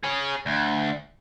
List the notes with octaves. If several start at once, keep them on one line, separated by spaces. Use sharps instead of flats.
G#4 C#5
D2